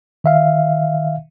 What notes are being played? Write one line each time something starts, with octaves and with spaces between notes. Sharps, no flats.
D#3 E5 F5